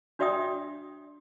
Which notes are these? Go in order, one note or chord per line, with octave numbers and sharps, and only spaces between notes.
D4 F#4 D5 E5 G5 D#6